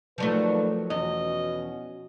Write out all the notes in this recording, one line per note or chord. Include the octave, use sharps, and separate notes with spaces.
D#2 F3 F#3 A3 B4 D5
E2 B2 C#4 F#4 D#5